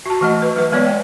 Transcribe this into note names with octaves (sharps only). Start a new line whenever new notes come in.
F#4 A5
E3 A3 D#5
B4
F#3 B4
G#3 B3 C#5 D5
G5